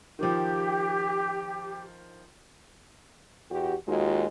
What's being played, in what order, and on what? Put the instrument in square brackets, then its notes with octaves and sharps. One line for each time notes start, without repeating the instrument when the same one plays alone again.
[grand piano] D#3 F3 [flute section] G4
[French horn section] E2 F#4 G4
D#2 G#3 D#4 F4 F#4